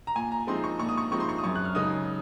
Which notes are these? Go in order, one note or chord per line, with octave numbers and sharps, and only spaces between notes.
A#5
A#2 G#5
A#5
F3 G#3 C4 D#4 C6
C#6
A#2 C#6
D#6
C#6
F3 G#3 C4 D#4 C#6
C6
C#6
D#6
F#2 C#6
F#6
F6
C#3 G#3 D#4 D#6